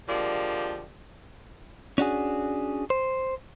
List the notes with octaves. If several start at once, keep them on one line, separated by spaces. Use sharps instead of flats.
D3 F3 G#3 A#3 G4 D5
C#4 D4 F#4 G#4
C5